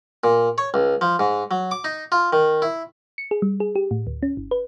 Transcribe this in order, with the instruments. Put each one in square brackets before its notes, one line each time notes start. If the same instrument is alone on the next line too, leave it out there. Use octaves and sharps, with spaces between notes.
[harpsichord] A#2
C#5
C#2
F3
G#2
F#3
D6
D#4
F4
D#3
E4
[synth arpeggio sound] C#7
G#4
G3
G#4
G4
A2
D2
C#4
G1
B4